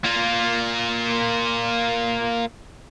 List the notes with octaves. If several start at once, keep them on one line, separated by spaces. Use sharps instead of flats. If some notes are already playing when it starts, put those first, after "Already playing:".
A#3 F4